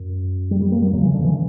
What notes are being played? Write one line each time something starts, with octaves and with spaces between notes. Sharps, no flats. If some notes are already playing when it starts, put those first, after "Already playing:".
Already playing: F#2
G3
G3
A#3
G3
E2 C#3 F#3
E3
D3
E3